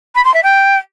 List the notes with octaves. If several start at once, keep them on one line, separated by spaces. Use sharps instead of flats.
B5
C6
E5
G5